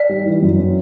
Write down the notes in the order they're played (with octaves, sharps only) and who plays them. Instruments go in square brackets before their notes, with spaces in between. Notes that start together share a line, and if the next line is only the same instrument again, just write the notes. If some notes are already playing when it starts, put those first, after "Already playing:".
Already playing: [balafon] D5
[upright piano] G3
E3
F#2
C#4